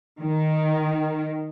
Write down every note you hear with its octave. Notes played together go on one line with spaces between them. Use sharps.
D#3